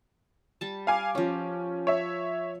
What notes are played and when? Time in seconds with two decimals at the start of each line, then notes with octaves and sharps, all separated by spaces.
0.61 G3 A5
0.87 F5 G#5 D6
1.15 F3 C#4 G4
1.87 C#5 E5